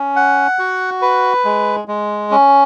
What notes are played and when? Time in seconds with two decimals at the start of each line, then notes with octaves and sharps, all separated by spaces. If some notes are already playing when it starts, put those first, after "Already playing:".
Already playing: C#4
0.16 F#5
0.59 F#4
1.02 B4
1.45 G#3
1.88 G#3
2.31 C#4